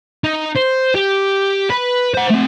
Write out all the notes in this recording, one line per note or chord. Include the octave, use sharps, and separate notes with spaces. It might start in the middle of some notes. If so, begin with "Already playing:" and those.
D#4
C5
G4
B4
C5 F#5
A3 C4